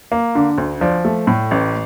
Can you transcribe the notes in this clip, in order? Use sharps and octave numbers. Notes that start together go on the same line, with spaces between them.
A#3
D3
D2
F3 D5
A3
A2
A1